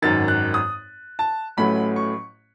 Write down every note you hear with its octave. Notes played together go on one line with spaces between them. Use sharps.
G#1 F#2 D#3 A6
F#6
D#6
A5
A1 A2 F#3 A3 C#4 B5
C#6